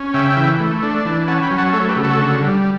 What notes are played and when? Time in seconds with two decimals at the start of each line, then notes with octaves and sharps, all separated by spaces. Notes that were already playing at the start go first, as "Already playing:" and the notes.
Already playing: C#4
0.14 C#3 E5 G5
0.37 E3
0.60 A3
0.83 D4
1.05 E3
1.28 C#4 F#5 A5
1.43 G5 B5
1.51 F#3
1.58 F#5 A5
1.73 A3 A4 C#5
1.88 G4 B4
1.96 C#3
2.04 F#4 A4
2.19 D3
2.41 G3